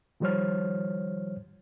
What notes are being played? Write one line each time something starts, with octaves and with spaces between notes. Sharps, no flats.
D#3 F3 G3 C5 C#5 F6